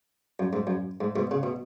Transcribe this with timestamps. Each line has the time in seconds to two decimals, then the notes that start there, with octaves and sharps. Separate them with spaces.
0.39 F#2
0.53 G#2
0.67 F#2
1.01 G#2
1.16 G#2 B2
1.31 C#3
1.43 B2